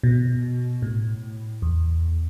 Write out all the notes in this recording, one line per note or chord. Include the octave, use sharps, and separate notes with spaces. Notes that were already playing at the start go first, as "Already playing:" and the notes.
B2
A2
E2